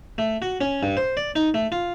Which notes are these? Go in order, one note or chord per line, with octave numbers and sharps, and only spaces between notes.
A3
F#4
C#4
G2
C5
D5
D#4
A3
F4